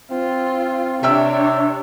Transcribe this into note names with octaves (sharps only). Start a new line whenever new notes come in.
C4 F4
C3 D4 C#5 E5 G5 E6